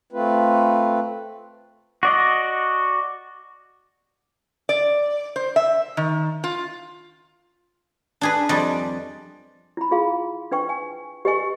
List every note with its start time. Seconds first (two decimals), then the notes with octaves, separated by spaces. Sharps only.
0.13 A3 C4 F4 B4
2.03 F#4 D5 D#5
4.69 D5
5.36 C5
5.56 E5
5.97 D#3
6.44 F4
8.21 D4 G#4 B4
8.49 F2 G3 D5 D#5
9.77 E4 B5
9.91 F4 G#4 F5 C6
10.51 D4 B4 G5 C#6
10.69 G#5
11.25 G4 B4 D#5 G#5 C#6